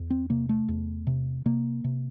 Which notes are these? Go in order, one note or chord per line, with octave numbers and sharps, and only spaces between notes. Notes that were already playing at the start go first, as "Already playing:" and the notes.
Already playing: E2
C4
C3 A#3
A3
E2
C3
C3 A#3
C3